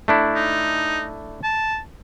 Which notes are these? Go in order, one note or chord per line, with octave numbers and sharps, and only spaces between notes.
A3 D4 E4
D#4
A5